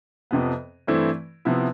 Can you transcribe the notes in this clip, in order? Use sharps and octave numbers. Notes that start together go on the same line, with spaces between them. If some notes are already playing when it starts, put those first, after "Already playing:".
F2 C3 F3 B3
G2 E3 A3 C4 E4
C3 F3 B3 E4